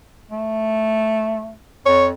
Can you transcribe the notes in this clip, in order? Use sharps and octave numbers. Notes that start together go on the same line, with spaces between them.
A3
F2 C#5